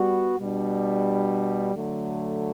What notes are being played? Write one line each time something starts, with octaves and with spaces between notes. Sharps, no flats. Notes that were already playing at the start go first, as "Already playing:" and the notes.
Already playing: G3 B3 F#4
B2 G3 D4
D3 F#3 A3